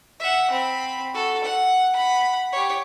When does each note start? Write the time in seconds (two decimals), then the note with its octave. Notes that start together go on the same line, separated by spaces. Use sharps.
0.20 E5 F#5
0.51 C4 B5
1.14 F#4 A4
1.44 F#5
1.93 F#5 B5
2.52 G4 C#5